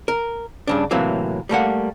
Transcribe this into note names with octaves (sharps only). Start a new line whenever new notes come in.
A#4
G2 C#3 D4
A2 C3 E3 F#3 A#3
G3 A3 A#3 F#5